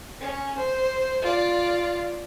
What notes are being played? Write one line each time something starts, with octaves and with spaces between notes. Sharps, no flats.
C#4
C5
F4 D5